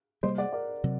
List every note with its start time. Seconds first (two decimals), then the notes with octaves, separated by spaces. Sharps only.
0.23 C3 G3 A#3 C5 D#5
0.38 D5 F#5
0.53 A#4 D5
0.84 C3 F#3